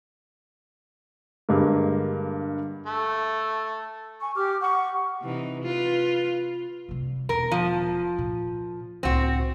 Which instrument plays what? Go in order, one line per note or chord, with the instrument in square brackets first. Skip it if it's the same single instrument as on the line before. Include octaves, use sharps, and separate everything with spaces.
[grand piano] G2 D3 G#3 A#3
[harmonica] A3
[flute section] G#5 C#6
G4 D6 F6
F#5 C#6
[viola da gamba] C3 E3 D#4
F4 B4
[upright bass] C3 G3
[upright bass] E1 [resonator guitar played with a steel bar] A#4
[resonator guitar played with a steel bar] F3
[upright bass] A#2
[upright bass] C#2 A2 [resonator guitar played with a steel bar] C4 F#4